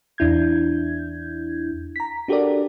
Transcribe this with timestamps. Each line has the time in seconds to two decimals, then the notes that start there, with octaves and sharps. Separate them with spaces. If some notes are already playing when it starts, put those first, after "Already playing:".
0.18 E2 D4 E4 G6 G#6
1.96 A#5 B6
2.28 D4 F#4 G4 A4 A#4 D5